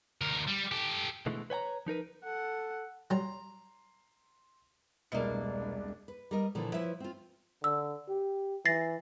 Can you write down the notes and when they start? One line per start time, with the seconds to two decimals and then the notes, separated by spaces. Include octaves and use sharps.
0.21 D2 A#4
0.48 G3
0.72 G4 A4
1.26 B2 D3 E3 G#3 A3
1.50 B4 C#5 G5 A#5
1.86 F3 D#4 A#4 B4
2.25 A4 F#5
3.10 F#3 G3 A#5 C6
5.12 E1 C2 B2 A#3 D4 C#7
6.08 B4
6.31 G3 A#4 D#5
6.55 A#2 D3 E3 F3
6.74 F3 E4 B4 C#5 E5
7.00 C4 F4
7.64 D3 E6
8.09 G4
8.66 E3 A6 A#6 C7